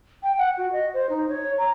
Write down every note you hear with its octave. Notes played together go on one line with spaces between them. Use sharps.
G5
F#5
F#4
D#5
C5
D#4
C#5
A#5